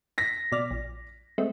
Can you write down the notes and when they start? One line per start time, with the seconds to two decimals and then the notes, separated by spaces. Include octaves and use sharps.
0.18 A#6 B6
0.52 B2 D5 F6
0.71 A#1
1.38 G#3 A3 C4